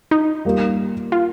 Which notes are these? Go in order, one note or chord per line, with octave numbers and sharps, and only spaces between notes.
D#4
G3 A#3 F4
F4